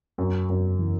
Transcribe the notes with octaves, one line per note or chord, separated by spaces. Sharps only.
F#2
F#2
E3